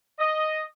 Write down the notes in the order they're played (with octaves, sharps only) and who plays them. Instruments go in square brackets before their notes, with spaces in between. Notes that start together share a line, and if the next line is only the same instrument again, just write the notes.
[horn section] D#5